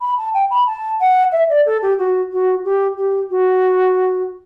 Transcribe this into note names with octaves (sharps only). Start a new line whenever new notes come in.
B5
A5
G5
B5
A5
F#5
E5
D5
A4
G4
F#4
F#4
G4
G4
F#4